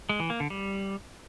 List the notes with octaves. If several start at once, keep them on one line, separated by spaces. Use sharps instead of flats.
G#3
E3
A#3
D3
G3